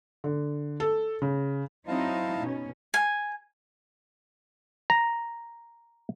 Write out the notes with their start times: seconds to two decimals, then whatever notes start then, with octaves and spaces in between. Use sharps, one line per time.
0.24 D3
0.80 A4
1.22 C#3
1.88 F#3 C4 D#4 E4 F5 A5
2.39 B2 C#4
2.94 G#5
4.90 A#5